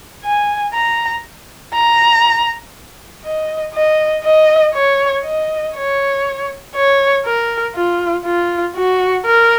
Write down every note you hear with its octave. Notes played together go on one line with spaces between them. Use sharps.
G#5
A#5
A#5
D#5
D#5
D#5
C#5
D#5
C#5
C#5
A#4
F4
F4
F#4
A#4